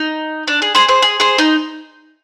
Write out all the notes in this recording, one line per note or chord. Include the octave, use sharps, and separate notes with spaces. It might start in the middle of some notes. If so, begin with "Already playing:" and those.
Already playing: D#4
D4
G#4
G#4 C5
G#4 C5
G#4
G#4 C5
D#4